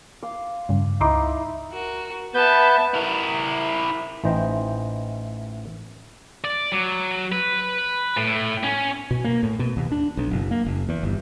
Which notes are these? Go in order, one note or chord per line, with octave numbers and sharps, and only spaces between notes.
F5 C6 D6
G2 C#3
C#2 D#4 E4 C6 D6
F#4 A#4
B3 B4 E5 A5 G6
E4 A#4
A1 E3 D#4 C5 D#5 G5
D5
F#3
B4
A2
C#4
B2
A#3
A2
B2
D#2
D4
B1
F#1
A#3
F#1
E2
G1